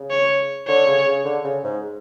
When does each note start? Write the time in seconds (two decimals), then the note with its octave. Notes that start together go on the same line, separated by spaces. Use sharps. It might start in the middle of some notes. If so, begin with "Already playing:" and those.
Already playing: C#3
0.10 C#5
0.67 D3 C#5
0.87 C#3
1.06 C#3
1.25 D3
1.44 C#3
1.63 G#2